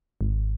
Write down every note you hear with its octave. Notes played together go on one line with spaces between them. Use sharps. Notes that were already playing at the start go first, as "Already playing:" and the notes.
G#1